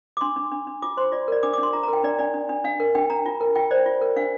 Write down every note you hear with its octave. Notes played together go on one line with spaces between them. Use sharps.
D6
D4 C6
D4
D4
D4
F4 D6
C5 C6
F4 D5
A#4 D5
D4 D6
D6
D4 C6
F4 A#5
A#5
A#4 G5
D4 D5
D4 D5
D4
D4
D4 F5
A#4
D4 G5
D4 A#5
F4
A#4
F4 G5
C5 D5
F4
A#4
D4 F5